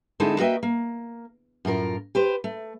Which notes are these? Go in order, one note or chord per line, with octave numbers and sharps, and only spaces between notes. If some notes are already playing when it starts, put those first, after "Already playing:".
D3 G#3 C4 D#4 E4 A4
A#3 F#4 B4 D#5 E5 G5
A#3
F#2 A2 F4 A#4
G4 B4 C5
A3